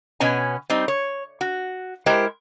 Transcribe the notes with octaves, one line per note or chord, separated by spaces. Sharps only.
B2 B3 C#4 G#5
G3 C4 D#4
C#5
F#4
G#3 E4 G4 A#4 C5